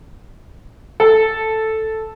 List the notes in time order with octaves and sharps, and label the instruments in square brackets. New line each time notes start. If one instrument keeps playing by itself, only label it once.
[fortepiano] A4